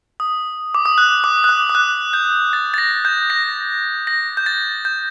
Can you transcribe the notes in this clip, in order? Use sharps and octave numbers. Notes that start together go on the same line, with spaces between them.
D#6
D6
D#6
F#6
D6
F#6
D#6
D#6
F#6
G6
A6
A6
A#6
G6
A#6
A#6
G6
A6
G6